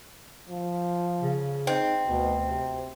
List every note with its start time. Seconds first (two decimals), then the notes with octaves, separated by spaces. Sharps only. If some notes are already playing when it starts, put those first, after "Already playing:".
0.49 F3
1.21 C#3
1.67 C4 D#4
2.07 D2 B2
2.50 C3